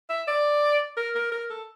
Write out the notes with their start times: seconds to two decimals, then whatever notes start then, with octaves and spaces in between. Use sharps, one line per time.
0.10 E5
0.28 D5
0.97 A#4
1.15 A#4
1.32 A#4
1.50 A4